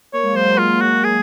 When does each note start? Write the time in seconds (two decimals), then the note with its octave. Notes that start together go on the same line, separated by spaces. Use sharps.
0.13 A#3 C#5
0.23 G#3
0.33 F#3 C5
0.44 G#3
0.58 F4
0.81 F#4
1.04 G#4